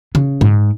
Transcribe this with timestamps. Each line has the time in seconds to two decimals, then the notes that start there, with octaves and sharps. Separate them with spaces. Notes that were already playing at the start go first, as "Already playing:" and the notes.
0.15 C#3
0.41 G#2